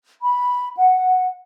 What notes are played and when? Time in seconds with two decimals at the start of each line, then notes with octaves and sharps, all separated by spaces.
0.21 B5
0.76 F#5